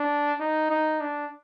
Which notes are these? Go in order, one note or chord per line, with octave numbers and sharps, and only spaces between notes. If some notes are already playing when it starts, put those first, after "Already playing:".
Already playing: D4
D#4
D#4
D4